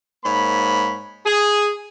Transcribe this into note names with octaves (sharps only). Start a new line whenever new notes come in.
G#2 A#3 C#5 B5
G#4